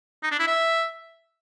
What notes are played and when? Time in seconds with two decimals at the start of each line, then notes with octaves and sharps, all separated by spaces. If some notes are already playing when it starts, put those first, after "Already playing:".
0.23 D#4
0.31 D4
0.39 E4
0.47 E5